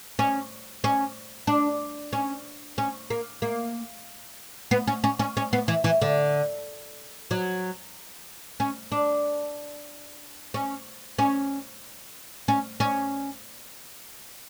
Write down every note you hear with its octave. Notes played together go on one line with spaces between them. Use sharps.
C#4
C#4
D4
C#4
C#4
A#3
A#3
B3
C#4
C#4
C#4
C#4
B3
E3
E3
D3
F#3
C#4
D4
C#4
C#4
C#4
C#4